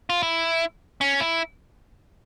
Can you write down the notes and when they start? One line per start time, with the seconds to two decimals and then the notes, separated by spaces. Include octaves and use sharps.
0.10 F4
0.23 E4
1.01 C#4
1.21 E4